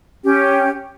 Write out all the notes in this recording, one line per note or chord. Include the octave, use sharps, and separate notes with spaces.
C#4 G4